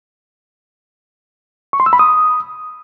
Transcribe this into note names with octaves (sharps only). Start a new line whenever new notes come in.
C#6
C6
E6
B5
D#6